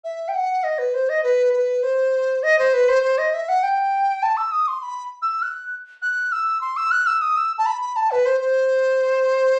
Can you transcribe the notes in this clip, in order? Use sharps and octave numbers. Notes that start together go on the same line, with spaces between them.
E5
G5
F#5
D#5
B4
C5
D#5
B4
B4
C5
D#5
C5
B4
C5
C5
D#5
E5
F#5
G5
A5
E6
D#6
C6
B5
E6
F#6
F#6
E6
C6
E6
F#6
E6
D#6
E6
A5
B5
B5
A5
B4
C5
C5